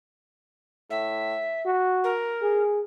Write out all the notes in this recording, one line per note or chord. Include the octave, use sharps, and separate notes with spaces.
A2 E5
F#4
A#4
G#4